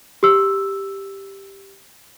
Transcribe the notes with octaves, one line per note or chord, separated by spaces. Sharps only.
G4 E6